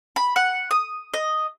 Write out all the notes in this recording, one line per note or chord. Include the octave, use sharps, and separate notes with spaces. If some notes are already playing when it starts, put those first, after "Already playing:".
B5
F#5
D#6
D#5